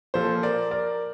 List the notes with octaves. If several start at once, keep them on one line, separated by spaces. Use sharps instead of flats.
A#2 F3 A4 C5
A#4 D5
A#4 D5